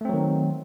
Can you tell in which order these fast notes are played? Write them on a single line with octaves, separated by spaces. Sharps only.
A3 C4 F#3 D#3